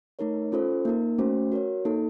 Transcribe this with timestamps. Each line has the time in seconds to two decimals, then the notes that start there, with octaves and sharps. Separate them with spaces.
0.19 A3 D#4 A#4 C#5
0.52 C#4 F4 A4 C5
0.85 A#3 D#4 A#4
1.18 A3 C#4 F#4 C5
1.52 F#4 A#4 C#5
1.85 A#3 D#4 A4